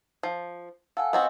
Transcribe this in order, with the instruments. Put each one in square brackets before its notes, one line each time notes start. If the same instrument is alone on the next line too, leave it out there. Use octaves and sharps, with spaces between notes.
[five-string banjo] F3
[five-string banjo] A4 [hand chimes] F5 F#5 G#5
[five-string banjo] B3 C4 F#4 [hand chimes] D#5